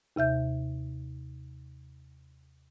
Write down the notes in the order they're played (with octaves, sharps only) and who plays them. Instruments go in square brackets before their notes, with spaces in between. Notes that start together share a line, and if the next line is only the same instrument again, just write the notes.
[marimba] D#2 C3 E5 G6